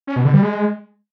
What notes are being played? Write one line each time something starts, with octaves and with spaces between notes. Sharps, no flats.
C#4
B2
D3
G3
G#3